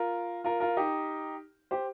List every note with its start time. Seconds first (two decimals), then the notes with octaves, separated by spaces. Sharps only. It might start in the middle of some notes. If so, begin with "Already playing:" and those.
Already playing: F4 A#4
0.44 F4 A#4
0.60 F4 A#4
0.77 D#4 G4
1.71 G4 C5